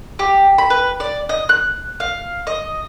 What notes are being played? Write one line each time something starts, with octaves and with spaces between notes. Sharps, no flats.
G4
B5
B4
D5
D#5
F#6
F5
D#5